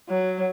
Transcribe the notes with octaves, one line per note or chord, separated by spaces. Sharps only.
F#3